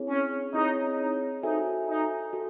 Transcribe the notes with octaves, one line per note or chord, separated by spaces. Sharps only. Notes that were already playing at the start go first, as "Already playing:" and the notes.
Already playing: C4 E4 G#4 C#5
C#4
C4 D#4 E4 G#4 C#5
D#4
D#4 F#4 A4 C5 E5 G#5
D#4
F#4 A4